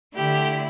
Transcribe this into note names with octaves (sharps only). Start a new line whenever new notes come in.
D3 A3 E4 G4